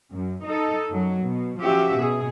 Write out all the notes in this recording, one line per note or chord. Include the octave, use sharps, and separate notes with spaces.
F#2
D#4 A4
F#2 F#3
B2
F3 C#4 F#4 G4 E5
B2 G#4